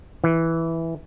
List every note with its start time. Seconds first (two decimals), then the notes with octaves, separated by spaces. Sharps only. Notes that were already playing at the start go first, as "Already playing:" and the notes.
0.24 E3